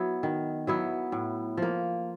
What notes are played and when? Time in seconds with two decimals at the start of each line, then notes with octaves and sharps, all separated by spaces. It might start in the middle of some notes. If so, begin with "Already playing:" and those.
Already playing: F#3 B3 E4
0.23 D#3
0.67 F#3 B3 E4
1.12 A2
1.57 F3 A#3